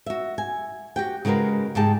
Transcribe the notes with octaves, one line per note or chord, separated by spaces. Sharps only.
F#4 E5
G#5
F#4 G4 G5
C#3 G#3 F#4 A#4 B4
G#2 G4 G#4 G5 A5